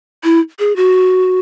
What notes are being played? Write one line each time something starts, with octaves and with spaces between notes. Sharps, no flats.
E4
G#4
F#4